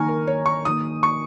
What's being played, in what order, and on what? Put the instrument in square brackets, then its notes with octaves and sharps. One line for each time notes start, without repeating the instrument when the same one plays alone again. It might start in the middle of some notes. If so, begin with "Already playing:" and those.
Already playing: [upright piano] D#3 A#3 D#4 [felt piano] G#5 A#5 C#6 F6
[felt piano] A#4
C#5
C#6
[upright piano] D#3 A#3 D#4 [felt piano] D#6
[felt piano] C#6